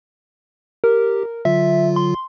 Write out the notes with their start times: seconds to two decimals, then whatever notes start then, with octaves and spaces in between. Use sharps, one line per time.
0.84 G4 A#4
1.45 D3 F#3 F4 E5
1.96 C6